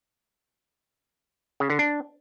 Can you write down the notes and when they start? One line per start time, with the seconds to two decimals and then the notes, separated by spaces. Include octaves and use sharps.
1.60 C#3
1.70 D3
1.79 D4